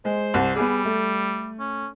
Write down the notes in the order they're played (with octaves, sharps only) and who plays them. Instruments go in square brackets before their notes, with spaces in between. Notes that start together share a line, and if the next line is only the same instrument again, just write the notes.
[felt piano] G#3 [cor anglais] C5
[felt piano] C2
[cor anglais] G3 [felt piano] B3 G#4
[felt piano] A3
[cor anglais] C#4